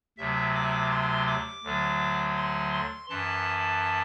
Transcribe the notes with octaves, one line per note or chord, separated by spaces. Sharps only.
D2 C3 F#3 E5
D6
C6
D6
D2 D3 F#3
C6
C6
F#2 E3 A5